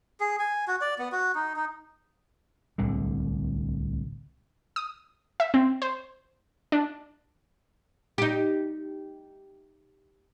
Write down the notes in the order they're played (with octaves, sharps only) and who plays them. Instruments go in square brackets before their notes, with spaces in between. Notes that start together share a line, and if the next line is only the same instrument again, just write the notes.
[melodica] G#4
G#5
F#4
D5
B3
F#4
D#4
D#4
[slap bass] D1 C2 D3
[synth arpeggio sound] D#6
E5
C4
C5
D4
[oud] D#4 G4